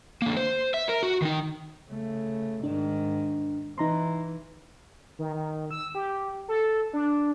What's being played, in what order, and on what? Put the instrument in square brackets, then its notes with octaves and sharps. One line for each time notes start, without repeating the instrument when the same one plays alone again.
[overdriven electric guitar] D3 A#3
C5
E5
A#4
F#4
D#3 D#4
[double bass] C#3 A3
[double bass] G#2 D#3 [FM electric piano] D4
[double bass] E3 [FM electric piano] D#4 A#5 C6
[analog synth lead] D#3
D#3
E6
G4
A4
D4